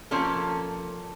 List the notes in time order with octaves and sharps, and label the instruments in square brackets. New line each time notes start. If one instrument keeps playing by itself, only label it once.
[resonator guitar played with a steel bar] F3 A#3 C#4 A4